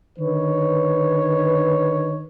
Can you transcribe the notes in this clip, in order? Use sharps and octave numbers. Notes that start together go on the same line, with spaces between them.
D3 D#3 B4 C#5